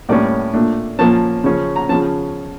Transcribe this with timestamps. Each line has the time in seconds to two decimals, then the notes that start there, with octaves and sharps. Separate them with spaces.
0.09 A2 G3 A#3 C#4 D5
0.54 A#2 A3 D4
0.99 A#2 F3 A#3 C#4 A5
1.44 C#3 F3 C#4
1.76 A#5
1.89 C#3 F3 C#4 A5